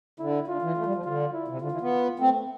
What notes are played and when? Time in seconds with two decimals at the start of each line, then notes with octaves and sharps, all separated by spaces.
0.19 D3 E4
0.48 D3 F4
0.62 E3
0.77 A3
0.86 G3
0.95 F3
1.05 D3 F4
1.33 E4
1.48 C3
1.62 D3 F4
1.72 E3
1.81 B3
2.18 A3 C4